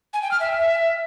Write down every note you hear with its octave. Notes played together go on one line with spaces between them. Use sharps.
G#5
G5
F6
E5